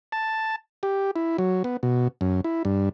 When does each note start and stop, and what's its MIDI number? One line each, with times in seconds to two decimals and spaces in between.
0.12 0.56 81
0.83 1.11 67
1.16 1.37 64
1.38 1.63 54
1.64 1.77 59
1.83 2.08 47
2.21 2.41 42
2.44 2.63 64
2.65 2.89 43